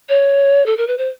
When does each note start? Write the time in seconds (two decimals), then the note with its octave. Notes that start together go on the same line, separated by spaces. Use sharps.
0.09 C#5
0.65 A4
0.77 A#4
0.87 B4
0.97 C5